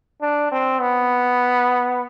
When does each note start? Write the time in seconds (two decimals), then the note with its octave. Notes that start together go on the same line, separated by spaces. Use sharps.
0.22 D4
0.52 C4
0.81 B3